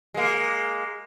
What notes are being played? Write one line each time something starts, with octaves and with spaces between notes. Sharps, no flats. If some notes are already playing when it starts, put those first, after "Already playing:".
G#3 A#3